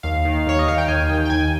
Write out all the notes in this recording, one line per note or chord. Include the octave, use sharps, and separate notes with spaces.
D#2 F5
D#3
D#2 C#5
D#5
D#3 F5
G5
D#2 G#5
D#3 G5
G5
D#2 G#5